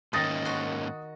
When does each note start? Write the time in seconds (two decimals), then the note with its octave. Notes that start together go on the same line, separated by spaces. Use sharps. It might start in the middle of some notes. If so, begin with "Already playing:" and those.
0.13 G#2 D#3 A#3 C#4 D#6 A6 A#6
0.45 F#4 C6